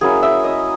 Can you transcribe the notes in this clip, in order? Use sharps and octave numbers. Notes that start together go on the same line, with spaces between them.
F#3 A#3 C#4 E4 G#4
E5
D#5